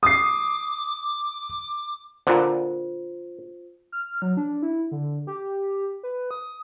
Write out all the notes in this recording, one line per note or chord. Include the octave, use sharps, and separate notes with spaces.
D6 D#6 C7
A#2 D3 F4 C5
F6
F#3
D4
E4
D3
G4
B4
D#6